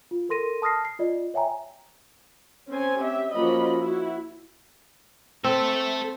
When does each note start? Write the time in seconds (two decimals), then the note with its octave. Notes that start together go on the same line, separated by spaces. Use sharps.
0.11 F4
0.29 A4 A#4 C6 A#6 D#7
0.62 A5 D#6 F6 A#6 C7
0.85 C7
0.99 F4 D5 D#5
1.34 C#5 E5 G5 G#5 A#5
2.69 C4 C#4 C5 G#5
3.00 G4 E5
3.33 F3 A#3 C#4 F#4 D#5 B5
3.79 E4 F#4
5.44 C4 A4 E5